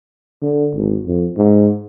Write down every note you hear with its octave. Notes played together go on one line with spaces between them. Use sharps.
D3
G#1
F2
G#2